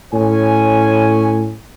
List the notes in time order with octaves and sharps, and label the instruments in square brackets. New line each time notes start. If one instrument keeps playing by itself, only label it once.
[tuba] A2 [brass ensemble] C#4 C#5 G#5